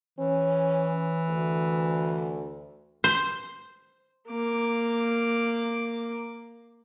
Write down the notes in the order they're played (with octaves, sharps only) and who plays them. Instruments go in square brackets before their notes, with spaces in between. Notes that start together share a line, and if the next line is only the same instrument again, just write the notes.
[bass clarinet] E3 [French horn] C#4
[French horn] D2
[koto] C5
[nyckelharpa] A#3 D6